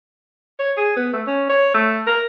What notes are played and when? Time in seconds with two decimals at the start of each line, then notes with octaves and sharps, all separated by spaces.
0.59 C#5
0.77 G#4
0.96 B3
1.13 A3
1.27 C#4
1.49 C#5
1.74 A3
2.07 A#4